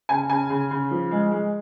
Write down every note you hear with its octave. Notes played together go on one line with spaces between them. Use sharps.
C#3 G#5
C#3 G#5
C#3
C#3
F3
G#3
G#3